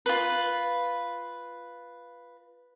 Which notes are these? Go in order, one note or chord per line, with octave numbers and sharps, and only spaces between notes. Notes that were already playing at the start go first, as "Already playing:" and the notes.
F4 B4